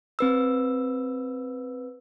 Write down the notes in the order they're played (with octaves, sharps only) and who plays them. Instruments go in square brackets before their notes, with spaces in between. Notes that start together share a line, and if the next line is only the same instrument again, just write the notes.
[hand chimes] C4 B4 E6